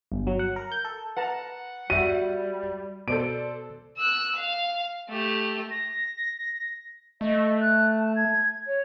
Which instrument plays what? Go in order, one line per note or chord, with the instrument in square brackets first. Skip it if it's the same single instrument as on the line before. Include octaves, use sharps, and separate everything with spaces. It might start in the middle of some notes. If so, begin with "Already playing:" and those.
[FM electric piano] G1
F#3
F#5
A#4
G6
A4
[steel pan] B4 A5 A#5 [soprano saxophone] F#5
[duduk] G3 [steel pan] F#4 E5 [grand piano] D#7
[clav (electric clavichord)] B2 [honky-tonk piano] A4 C5 D5 [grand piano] D7
[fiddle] E6 F#6
F5
A3 G4
[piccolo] A#6
[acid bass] A3 [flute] D#5
[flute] F#6
A5
G#6
C#5